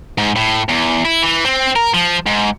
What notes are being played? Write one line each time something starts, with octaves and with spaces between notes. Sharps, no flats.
G#2
A2
E2
E4
E3
C4
A#4
F3
G#2